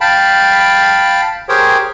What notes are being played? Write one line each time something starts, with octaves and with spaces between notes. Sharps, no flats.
F5 G5 A5 B5
G4 G#4 A#4 C5 C#5 G5